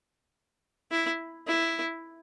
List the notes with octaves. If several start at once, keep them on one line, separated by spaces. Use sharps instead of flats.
E4
E4